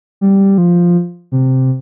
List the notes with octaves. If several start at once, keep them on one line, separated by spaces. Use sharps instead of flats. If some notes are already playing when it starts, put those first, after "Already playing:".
G3
F3
C3